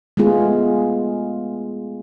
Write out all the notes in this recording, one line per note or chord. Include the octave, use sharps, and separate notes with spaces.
G#3 A3 B3 F4 G#4